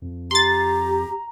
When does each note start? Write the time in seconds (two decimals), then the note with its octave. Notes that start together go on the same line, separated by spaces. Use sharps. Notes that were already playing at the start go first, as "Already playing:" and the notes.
0.02 F2
0.31 G4 A#5 C6 A6